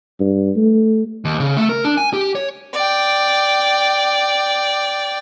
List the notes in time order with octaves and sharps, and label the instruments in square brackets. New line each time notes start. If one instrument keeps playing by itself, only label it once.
[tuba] G2
A3
[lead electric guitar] D#2
C#3
A3
A#4
D4
G#5
G4
C#5
[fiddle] D5 G5